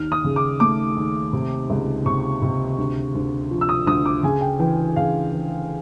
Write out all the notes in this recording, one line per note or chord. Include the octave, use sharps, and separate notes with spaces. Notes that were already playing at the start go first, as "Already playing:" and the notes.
Already playing: D#2 F6
D#6
C#3
D6
A3 D6
D#2
C3
C#2
C3 C#6
C3
D2
D2
F3
E6
D#6
D2 D#6
D6
C#3 G#5
G5
E3 G5
C#3 F5
E3